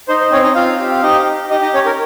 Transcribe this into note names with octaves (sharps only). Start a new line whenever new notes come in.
D#4 C5
C5
C4 C#4 C#5
D#4 D#5
C4 F4 F5
G4
F5
D#4 G4 D#5
G4
D#4 G4 D#5
D#4 D#5
C#4 C#5
A#4